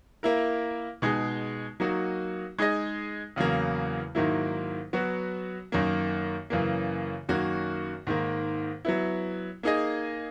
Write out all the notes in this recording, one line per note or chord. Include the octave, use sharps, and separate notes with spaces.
A#3 E4 A#4
B2 G#3 D#4 G#4
F#3 A#3 D#4 F#4
G#3 D#4 G#4 D#5
E2 C#3 F#3 A#3
G#2 D#3 F#3 A#3 E4
F#3 B3 F#4
F#2 D#3 A#3
F#2 C#3 E3 A#3
F#2 D#3 A#3 C#4 F#4
G#2 D#3 A#3
F#3 B3 E4
A#3 D#4 G#4 D#5